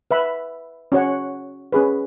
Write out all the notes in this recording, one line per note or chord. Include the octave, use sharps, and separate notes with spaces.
B4 E5 B5
C#4 F#4 C#5 F#5
C#4 G#4 B4